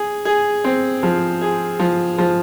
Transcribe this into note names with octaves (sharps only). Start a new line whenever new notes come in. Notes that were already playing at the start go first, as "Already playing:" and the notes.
Already playing: G#4
G#4
C4
F3
G#4
F3
F3